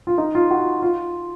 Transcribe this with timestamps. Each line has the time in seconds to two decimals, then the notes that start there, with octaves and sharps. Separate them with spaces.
0.07 F4
0.18 D#4
0.35 F4
0.51 F#4
0.82 F4